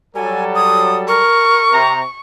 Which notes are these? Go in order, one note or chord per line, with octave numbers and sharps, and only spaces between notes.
F#3 G3 A4 G#5
D#6
A#4 C#6
C3 A#5